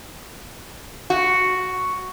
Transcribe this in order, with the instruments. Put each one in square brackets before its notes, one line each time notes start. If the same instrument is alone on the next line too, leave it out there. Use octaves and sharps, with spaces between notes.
[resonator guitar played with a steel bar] F#4